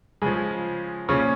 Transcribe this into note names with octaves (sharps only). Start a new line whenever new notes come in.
C#3 F3 G#3
A#2 C#3 F3 C#4